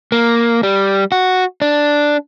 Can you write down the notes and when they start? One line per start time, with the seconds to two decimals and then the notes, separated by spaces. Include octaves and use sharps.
0.12 A#3
0.63 G3
1.12 F#4
1.62 D4